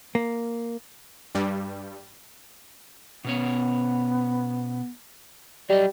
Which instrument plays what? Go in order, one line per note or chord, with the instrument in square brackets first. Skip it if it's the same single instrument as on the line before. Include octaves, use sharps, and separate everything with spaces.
[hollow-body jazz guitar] A#3
[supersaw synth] G2 G3
[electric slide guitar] B2 C#4 C#5 [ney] B3
[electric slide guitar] F#3 D#5 [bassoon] G3 [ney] D5